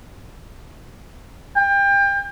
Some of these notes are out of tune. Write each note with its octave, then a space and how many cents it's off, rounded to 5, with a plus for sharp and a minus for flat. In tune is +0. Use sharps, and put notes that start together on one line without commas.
G5 +30